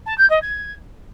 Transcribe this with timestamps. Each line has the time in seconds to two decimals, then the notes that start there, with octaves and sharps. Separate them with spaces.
0.06 A5
0.18 G6
0.30 D#5
0.42 G#6